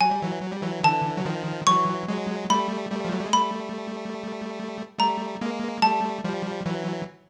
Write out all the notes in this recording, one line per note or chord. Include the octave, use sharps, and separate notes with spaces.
F#3 G#5
G3
E3 F#3
F#3
G3
E3 F#3
D3 E3 A5
F#3
D#3 F3
E3 F#3 C#6
F#3 G#3
G3 A3 B5
G3 A3
F3
F#3
G3
G#3
G3 A3 B5
G3 A3 A#5
G#3 A#3
G3 A3 A5
F3 G3
E3 F#3